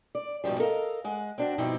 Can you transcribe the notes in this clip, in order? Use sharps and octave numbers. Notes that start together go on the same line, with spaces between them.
D5
G#2 B2 D3 F3 G3
A4 A#4 D#5 F5
G#3 F#5
C4 D4 F#4
G2 B2 F3 C4 D#4 E4